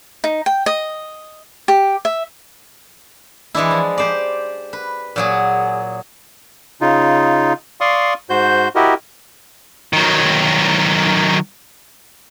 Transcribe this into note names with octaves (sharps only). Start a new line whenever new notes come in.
D#4
G5
D#5
G4
E5
E3 G#3 D4 E4
F3
G4 C5 D5
B4
A#2 F#3 G#4
C#3 D#4 F4
D5 F5 C6 C#6 D#6
G#2 F#4 C5 G6
E4 F#4 G4 A#4 D#5
D#3 F#3